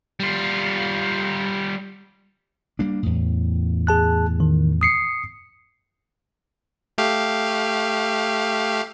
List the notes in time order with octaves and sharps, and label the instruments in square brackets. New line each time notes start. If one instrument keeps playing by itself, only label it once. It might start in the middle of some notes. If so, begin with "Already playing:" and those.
[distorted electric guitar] G3 F4
[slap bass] G3 A#3 D4
E2 A2
[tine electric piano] G#4 A5 F#6
D#3
D#6 C7 C#7
[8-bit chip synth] A3 G4 F5